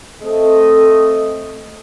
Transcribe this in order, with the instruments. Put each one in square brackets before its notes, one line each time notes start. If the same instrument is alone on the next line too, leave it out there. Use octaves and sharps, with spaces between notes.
[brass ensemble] A3 C4 A4 D#5